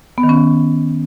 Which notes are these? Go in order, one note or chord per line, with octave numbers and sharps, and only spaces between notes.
B3
D#3
C#4